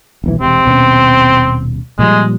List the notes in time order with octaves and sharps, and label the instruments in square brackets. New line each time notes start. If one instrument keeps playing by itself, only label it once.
[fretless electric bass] D#1 B1 E3
[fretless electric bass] E1 C3 [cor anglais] C4
[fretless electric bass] D#1 B2 C#4
[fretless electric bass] A#2 F3 G3 [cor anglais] G#3